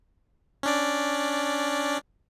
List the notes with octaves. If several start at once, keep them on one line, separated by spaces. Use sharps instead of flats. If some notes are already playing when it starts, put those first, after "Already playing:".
C#4 D4 D5